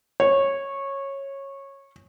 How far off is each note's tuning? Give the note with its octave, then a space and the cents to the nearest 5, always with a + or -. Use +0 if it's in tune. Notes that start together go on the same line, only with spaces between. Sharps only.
C#5 -15